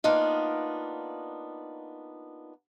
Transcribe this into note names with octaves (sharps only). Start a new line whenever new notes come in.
A#3 B3 D4 D#4 F4